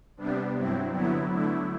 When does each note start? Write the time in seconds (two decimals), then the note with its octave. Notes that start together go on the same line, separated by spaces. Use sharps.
0.17 C3 G3 B3 D4
0.55 G2 F#3 C4 E4
0.93 D3 F#3 B3 E4
1.31 D3 A3 E4